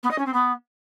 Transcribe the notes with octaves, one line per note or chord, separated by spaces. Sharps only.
B3
D#5
C#4
C4
B3